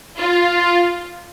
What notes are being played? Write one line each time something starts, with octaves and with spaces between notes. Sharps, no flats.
F4